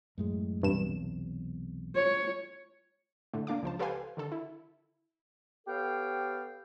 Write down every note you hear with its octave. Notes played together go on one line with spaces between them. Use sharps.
F#2 A2 G#3
B1 E2 G2 C3 E7
C#5
A2 D3 A3
A#3 D4 F5 D6
C#2 F3 C5 A5
G4 A4 B4 C5 F5 G#5
D3 D#3 A4
E4
B3 G4 A4 C#5 F5 G5